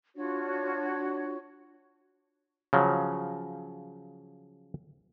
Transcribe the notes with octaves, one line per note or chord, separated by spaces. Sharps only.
D4 F4 F#4 C#5
C#3 F3 F#3